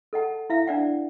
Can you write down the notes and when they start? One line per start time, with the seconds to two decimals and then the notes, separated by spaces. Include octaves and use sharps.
0.13 A4 D#5 F#5 A5
0.50 E4 E5 F5
0.67 D4 D5 F#5